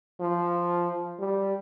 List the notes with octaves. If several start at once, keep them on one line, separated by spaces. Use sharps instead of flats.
F3
G3